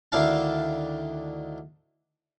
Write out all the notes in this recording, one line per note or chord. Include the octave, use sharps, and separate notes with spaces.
D2 D#3 D4 E4 F5 A5